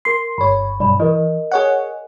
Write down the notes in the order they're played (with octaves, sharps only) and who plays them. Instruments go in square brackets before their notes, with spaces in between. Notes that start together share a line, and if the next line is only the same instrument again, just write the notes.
[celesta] A#4 C7 [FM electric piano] C6
[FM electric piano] G1 C#5 [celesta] B5
[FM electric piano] B1 G2 [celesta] D5 B5
[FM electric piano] E3 [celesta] A#4 D#5
[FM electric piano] G#4 C#5 F#5